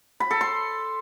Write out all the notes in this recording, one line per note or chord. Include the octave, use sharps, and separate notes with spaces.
B5
A4
C6